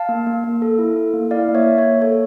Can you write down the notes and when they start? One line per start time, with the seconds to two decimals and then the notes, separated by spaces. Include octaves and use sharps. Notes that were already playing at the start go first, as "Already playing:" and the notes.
Already playing: F5 A5
0.09 A#3
0.27 A#3
0.44 A#3
0.62 A4
0.79 E4
0.96 A4
1.14 A#3
1.31 E4 D5 F5
1.49 A#3
1.55 C#5 E5
1.67 A#3
1.78 C#5
1.84 A#3
2.02 A4 C#5